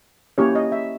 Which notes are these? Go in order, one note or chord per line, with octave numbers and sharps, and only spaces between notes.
A#3 C#4 E4 G4 C#5
D#5
E5